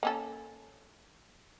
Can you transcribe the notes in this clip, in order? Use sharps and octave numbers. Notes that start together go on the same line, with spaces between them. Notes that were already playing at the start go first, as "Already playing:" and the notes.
A#3 C#4 A4